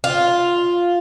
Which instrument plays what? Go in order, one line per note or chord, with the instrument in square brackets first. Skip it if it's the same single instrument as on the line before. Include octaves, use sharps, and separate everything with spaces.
[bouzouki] F4